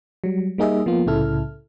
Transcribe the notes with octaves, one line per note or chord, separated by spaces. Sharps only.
F#3 G3
G3 A#3 D#4 G#4 D#5 E5
F3 A#3 B3 F4
C2 A2 C#3 E4 A4 F6